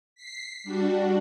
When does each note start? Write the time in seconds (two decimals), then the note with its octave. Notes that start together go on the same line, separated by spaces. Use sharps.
0.15 B6 C7
0.64 G3 D4 F#4